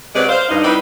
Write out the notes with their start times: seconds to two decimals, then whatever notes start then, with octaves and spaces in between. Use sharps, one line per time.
0.15 C3 F#3 G#3 B4 D5
0.29 C5 F5
0.49 G2 D#4
0.63 G3 C4 D#4 E4 B4 D5